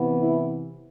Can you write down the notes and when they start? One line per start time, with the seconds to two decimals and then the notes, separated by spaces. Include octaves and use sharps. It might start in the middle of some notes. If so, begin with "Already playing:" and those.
Already playing: C3 E3 B3
0.19 E4